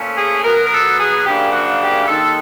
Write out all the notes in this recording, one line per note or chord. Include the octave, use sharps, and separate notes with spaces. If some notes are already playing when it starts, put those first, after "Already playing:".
Already playing: A#2 F3 A3 C#4
G#4
B2 F#3 B3 A#4
A#4
A4
G#4
F#2 C#3 F3 A#3 D4 G4
F#4
G4
D#2 D#3 G#3 A4